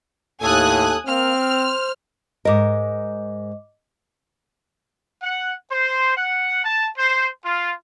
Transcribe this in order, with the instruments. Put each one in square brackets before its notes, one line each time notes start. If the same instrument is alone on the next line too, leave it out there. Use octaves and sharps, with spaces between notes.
[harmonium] D#2 A4 [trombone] A2 [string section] G#5 D#6 F#6
[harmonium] A#3 [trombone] C4 [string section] F6
[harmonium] C5
[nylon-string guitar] G#2 A#4 [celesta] D#5 D6
[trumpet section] F#5
C5
F#5
A5
C5
F4